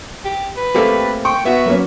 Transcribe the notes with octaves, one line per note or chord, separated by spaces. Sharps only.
G4
B4
A3 A#3 C4 G4 A4
G5 C#6
B3 F#4 E5
F#3 A#3 C#4